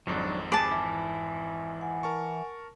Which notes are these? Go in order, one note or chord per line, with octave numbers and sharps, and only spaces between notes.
G#1 F2 G#2 F#3 D4
G4 G#4 B4 G#5 A5 D6
E3 E4
F#5 G#5
A#4 A5 C#6